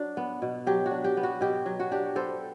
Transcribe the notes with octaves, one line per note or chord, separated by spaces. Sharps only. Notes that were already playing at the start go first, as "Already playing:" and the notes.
Already playing: F#3 D4
B3
B2
F#3 G4
F#4
D4
G4
B3
F#4
B2 G4
F#3
F#4
D4 G4
B3 A4 C5